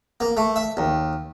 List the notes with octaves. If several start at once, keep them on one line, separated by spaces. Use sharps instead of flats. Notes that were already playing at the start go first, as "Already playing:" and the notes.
A#3
A3
E5
D#2